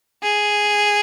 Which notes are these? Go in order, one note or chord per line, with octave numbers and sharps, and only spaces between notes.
G#4